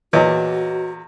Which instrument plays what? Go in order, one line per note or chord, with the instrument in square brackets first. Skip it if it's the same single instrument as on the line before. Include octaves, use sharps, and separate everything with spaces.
[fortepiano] E2 A#2 [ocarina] F#4 [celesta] B4 C#5 D#5